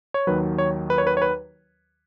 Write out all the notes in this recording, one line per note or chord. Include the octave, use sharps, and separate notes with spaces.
C#5
D#2 D#3 F#3 B4
C#5
B4
C#5
B4
C#5
B4